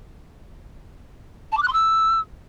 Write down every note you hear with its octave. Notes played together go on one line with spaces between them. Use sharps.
A5
D6
F#6
C6
E6